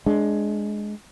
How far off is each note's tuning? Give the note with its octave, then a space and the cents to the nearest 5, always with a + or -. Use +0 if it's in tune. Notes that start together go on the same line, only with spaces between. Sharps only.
G#3 +10 D4 +0